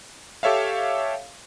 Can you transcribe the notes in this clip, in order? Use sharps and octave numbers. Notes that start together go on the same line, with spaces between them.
G4 A4 C#5 E5 F5